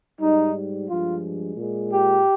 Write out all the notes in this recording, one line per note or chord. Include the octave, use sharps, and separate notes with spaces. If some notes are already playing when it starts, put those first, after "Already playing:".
G#2 G3 D#4
G2 F3 G#3 F4
A#2 G#3
G4